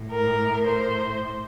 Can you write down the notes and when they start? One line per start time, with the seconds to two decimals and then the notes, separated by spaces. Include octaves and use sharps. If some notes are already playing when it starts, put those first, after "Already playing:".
Already playing: A2
0.11 A#4
0.66 C5